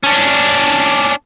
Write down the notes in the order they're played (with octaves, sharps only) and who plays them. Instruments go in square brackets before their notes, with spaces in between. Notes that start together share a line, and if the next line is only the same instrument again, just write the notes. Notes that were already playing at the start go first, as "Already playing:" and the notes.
[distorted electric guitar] C#4 D4